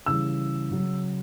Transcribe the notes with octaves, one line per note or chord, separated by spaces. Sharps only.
C#3 E3 G3 E6
C#3 F#3